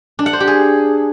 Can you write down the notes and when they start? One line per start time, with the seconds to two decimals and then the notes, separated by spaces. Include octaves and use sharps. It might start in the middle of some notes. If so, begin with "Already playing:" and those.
0.19 D4
0.26 F#5
0.33 C5
0.40 G4
0.47 G#4